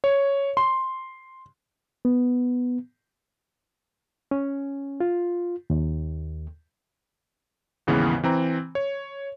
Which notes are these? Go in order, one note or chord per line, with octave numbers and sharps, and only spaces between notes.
C#5
C6
B3
C#4
F4
D#2
D#2 G#2 C#3 E3 B3
E3 C4 A#5
C#5